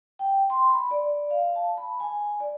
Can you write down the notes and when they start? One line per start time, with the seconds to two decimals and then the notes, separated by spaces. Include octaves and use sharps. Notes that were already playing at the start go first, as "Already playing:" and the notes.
0.19 G5
0.50 C6
0.70 B5
0.91 D5
1.31 F5
1.56 A5
1.78 B5
2.00 G#5
2.40 D5